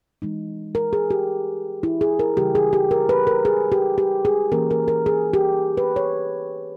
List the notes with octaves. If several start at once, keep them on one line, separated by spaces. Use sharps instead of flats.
E3 G#3 D#4
A#4
G#4
G4
E4
G#4
A#4
C#3 E3 G3 G4
G#4
G4
A#4
B4
A#4
G#4
G4
G4
G#4
E3 A#3 C#4 A#4
A#4
A#4
G#4
G4
B4
C#5